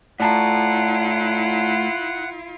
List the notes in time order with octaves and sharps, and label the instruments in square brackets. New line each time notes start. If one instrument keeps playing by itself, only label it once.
[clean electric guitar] A2 [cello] E4 F4 [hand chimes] D5 A5 A#5 [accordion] F#5